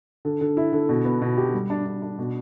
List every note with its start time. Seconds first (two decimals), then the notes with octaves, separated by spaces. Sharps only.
0.25 D3
0.41 D3
0.57 E4
0.73 D3
0.89 B2
1.05 B3
1.22 B2
1.37 G4
1.54 G3
1.70 D4
1.86 D4
2.02 D4
2.19 B2